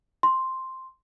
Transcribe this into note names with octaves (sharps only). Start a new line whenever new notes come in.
C6